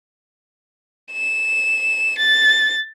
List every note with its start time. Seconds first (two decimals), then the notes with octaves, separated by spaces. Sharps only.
1.13 E7
2.18 A6